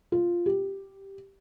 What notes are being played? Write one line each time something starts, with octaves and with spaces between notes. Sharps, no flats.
F4
G4